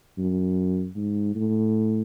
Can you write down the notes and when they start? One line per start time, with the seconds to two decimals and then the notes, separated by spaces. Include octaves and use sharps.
0.18 F#2
0.96 G#2
1.35 A2